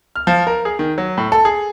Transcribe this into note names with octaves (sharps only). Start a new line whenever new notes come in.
F6
F3
A#4
G#4
D#3
F#3
A2
A4
G#4